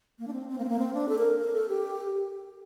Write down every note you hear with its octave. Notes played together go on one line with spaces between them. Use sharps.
A#3
D4
C4
C4
A#3
C4
A#3
C4
D4
A4
A#4
A#4
A4
G4